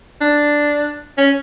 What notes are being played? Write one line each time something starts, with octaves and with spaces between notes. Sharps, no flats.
D4
C#4